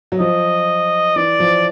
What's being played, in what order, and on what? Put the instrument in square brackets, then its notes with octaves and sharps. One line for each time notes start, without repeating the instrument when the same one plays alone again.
[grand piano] F#3
[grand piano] F3 [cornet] D#5
[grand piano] E3 [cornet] D5
[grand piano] F3